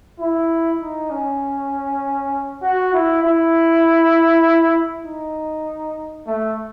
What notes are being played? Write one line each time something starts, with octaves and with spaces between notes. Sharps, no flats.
E4
D#4
C#4
F#4
E4
E4
D#4
A3